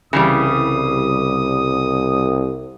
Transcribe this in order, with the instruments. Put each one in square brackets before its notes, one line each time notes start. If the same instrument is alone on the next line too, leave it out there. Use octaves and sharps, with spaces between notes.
[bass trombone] C2 [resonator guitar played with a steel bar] C#3 E3 G3 [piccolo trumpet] D#6